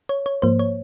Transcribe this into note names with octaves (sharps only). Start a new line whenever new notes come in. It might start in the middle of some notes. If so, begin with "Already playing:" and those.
C#5
C#5
G#2 F3 A#3 C5
C#5